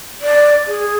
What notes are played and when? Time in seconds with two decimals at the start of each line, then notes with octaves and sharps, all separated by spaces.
0.21 D5
0.67 G#4